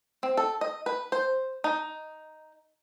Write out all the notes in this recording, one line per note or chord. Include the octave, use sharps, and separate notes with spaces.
C4
A4
D#5
B4
C5
D#4